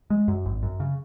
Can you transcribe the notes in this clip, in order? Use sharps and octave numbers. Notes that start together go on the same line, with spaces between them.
G#3
F#2
G#1
F#2
C#3